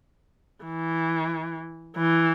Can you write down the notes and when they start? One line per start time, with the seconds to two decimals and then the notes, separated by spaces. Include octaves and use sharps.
0.64 E3
1.98 E3